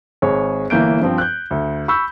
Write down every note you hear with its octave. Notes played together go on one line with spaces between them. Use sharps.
G#1 G#4 C#5
G1 E3 A#3 G6 D7
G2 F3 C4
F#6 G6
D2
B5 C#6 E6 G6